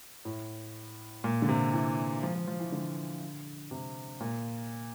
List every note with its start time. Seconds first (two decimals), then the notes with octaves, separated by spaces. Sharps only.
0.25 A2
1.24 A#2
1.42 D3
1.49 C3
1.73 E3
2.23 F3
2.35 F3
2.47 F3
2.60 E3
2.72 D3
3.71 C3
4.20 A#2